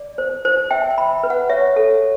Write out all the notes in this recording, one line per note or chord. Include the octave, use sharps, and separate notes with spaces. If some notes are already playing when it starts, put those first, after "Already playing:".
Already playing: D5
C5
C5
E5 G5
E5
B5
B4
F#5
C#5 E5
A4